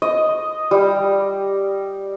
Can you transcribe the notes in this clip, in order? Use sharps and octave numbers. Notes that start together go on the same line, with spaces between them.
D#5
G3